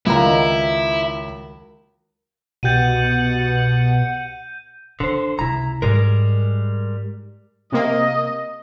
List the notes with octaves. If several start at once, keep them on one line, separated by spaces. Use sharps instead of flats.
C#2 D#3 F#3 A#3 E4 A#5
C2 B2 G4 F#5 G6 A6 D#7
D3 D4 C5
C#2 C3 E4 A#5
G#2 G3 G#3 A#4
C3 A#3 D#5